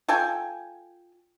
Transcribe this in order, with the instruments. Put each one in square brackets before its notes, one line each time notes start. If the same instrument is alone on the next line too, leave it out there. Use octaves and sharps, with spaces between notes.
[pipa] F4 A4 G5 G#5